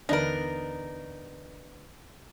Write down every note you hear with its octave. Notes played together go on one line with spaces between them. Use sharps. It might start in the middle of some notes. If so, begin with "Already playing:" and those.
D#2 D3 E3 B3 D4 D#4 A#4